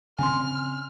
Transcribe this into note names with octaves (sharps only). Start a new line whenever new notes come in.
C#3 C4 G#5 C6 F6